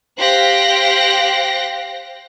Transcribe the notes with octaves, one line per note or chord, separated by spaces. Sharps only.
G4 C5 F5 G5 F#6 A#6